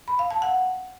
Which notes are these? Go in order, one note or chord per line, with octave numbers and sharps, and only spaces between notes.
B5
F5
A5
F#5